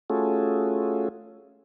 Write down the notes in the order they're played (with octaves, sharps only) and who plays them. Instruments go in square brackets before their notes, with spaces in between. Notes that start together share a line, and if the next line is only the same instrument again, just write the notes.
[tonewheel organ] A3 C#4 F4 F#4 G#4 A4